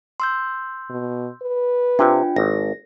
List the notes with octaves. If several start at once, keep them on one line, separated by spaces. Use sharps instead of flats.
C6 E6 G6
B2
B4
C3 D4 F4 G5
G#1 A#6